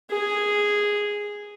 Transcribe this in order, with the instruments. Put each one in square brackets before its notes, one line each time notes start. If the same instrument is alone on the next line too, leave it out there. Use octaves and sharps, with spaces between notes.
[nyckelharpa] G#4